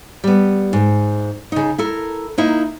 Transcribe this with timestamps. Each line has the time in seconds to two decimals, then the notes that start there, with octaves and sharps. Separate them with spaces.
0.24 G3 B3
0.73 G#2
1.52 C#3 D#4
1.78 E4 A4 A#4
2.38 A#3 D#4 E4